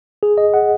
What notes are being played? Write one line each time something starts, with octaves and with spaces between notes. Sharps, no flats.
G#4
D#5
F#5